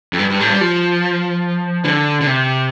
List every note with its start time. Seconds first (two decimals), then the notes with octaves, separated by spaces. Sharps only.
0.13 F2
0.19 G2
0.30 G2
0.41 A2
0.50 G3
0.61 F3
1.85 D3
2.21 D3
2.27 C3